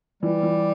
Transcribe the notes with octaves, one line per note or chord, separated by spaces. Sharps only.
E3 G3
E3